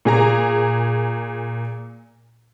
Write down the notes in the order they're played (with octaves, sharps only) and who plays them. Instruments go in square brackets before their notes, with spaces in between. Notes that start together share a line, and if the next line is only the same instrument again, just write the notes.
[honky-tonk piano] A#2 G#4 A#5